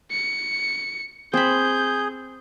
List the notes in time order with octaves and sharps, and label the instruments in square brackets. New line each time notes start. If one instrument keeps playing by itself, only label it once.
[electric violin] C#7
[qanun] C4 B5 [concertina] G#4 [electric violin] G6